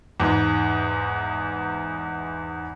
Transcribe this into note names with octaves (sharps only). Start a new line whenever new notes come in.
E2 G#2